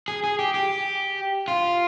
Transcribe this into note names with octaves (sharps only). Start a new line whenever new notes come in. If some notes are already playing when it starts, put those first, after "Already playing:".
G#4
G#4
G4
G4
F4